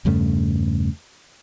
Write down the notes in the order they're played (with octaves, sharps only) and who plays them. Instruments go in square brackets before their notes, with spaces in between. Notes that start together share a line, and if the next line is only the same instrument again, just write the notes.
[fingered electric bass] E2 G2 C#3 A3